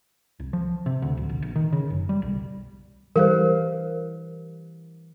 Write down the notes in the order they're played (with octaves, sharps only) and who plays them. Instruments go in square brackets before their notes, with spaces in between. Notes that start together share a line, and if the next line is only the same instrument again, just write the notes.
[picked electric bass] C2
F3
C3
D2
D1
A#1
A#1
D#3
C#3
F#1
G3
B1
[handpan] E3 G3 F5 [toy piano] A#4 C5